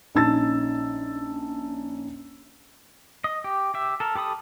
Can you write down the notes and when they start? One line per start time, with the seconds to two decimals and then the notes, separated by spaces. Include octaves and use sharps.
0.15 A#1 C#4 D#4 A5 E6 A6
3.24 D#5
3.44 G4
3.74 G4 E5
4.00 A4 A#4
4.15 G4 A4 B5 D#6